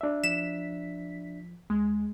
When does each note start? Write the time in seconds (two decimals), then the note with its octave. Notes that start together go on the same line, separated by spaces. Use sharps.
0.01 D4 E5
0.24 F3 B6 E7
1.70 D2 G#3